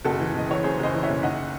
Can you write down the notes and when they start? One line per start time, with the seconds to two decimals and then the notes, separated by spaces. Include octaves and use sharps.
0.05 F#1 F#4 A4
0.20 E3
0.35 F#1 D#5
0.49 E3 C#5
0.64 F#2 G#4 C5
0.79 F#1 C5 D#5
0.94 E3
1.03 C#5 E5
1.09 F#1
1.22 D#3 D#5 F#5